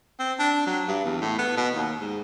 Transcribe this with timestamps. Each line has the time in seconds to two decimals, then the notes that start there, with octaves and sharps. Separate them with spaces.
0.19 C4
0.39 D4
0.67 F#3
0.88 G2
1.05 E2
1.21 A2
1.39 B3
1.57 B2
1.76 D#2
2.00 G#2